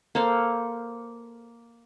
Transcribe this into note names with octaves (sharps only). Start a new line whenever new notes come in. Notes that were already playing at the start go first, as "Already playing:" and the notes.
A#3 A4 C5 F5